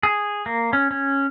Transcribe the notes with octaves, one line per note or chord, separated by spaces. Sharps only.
G#4
A#3
C#4
C#4